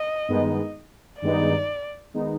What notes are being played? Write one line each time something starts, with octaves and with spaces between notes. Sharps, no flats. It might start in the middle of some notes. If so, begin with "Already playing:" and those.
Already playing: D#5
G2 D#3 G#3 B3 D#4
G2 D#3 G#3 B3 D#4 D5
D#3 G#3 B3 D#4